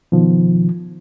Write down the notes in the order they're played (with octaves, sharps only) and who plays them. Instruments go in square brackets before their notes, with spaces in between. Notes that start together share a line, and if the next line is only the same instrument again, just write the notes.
[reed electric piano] B2 D#3 F3